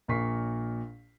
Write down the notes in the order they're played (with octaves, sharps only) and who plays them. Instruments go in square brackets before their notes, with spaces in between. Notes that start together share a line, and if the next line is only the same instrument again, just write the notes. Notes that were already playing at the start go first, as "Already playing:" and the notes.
[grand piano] A#1 A#2 A#4 C#6 B6 C7